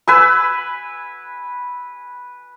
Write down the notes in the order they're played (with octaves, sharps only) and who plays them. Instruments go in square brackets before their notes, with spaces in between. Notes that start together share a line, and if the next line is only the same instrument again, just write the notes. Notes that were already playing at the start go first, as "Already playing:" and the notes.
[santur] B4 G#5 E6